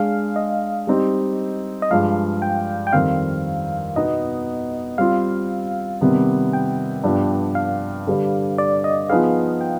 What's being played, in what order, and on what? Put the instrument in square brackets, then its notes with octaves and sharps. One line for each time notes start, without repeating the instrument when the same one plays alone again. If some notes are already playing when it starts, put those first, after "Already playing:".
Already playing: [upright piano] G#3 D4 G#4 [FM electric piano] F5
[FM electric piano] D#5
[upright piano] G3 C4 D#4 G4
[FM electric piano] D#5
[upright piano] G2 F3 G#3 [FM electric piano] F5
[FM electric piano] G5
G5
[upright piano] F2 D#3 G3 C4 [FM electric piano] F5
[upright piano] B2 B3 D#4 [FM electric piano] D#5
[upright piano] G3 C4 F4 [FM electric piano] F5
[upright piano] C3 D#3 G3 B3
[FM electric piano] G5
[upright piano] G2 F3 B3 D4 G4
[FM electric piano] F5
[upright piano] D3 G3 D4 G4 B4
[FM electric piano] D5
D#5
[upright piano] F3 B3 D#4 G#4 B4 [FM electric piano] F5
[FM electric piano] G5